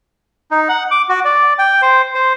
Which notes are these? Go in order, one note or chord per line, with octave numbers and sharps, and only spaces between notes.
D#4
F#5
D6
F#4
D5
G5
C5
C5